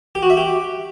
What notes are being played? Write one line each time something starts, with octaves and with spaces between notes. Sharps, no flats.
G4
F#4
E5
G4